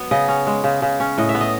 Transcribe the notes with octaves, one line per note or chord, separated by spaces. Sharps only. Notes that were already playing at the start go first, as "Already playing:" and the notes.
Already playing: F#3 B3
C#3 D#5
C#4
G#3
C#3
C#3
C#4
A2 D#5
E5
B3
D#5